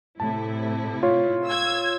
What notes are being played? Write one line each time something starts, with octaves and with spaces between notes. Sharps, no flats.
A2 C3 E4 A5
F4 C#5
E6 G#6